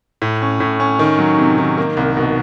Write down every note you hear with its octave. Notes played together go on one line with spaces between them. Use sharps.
A2
C#4
A2
C#4
D#3
F#3
C3
D#3
A#3
C2
B2